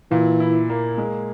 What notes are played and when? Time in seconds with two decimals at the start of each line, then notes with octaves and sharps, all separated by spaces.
0.11 A#2 E3
0.40 E4
0.70 A#3
0.98 G#3